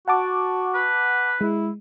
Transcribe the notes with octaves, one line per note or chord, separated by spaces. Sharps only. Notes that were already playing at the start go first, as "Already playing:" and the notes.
F#4 F#5 A5 D6
B4
G#3 E4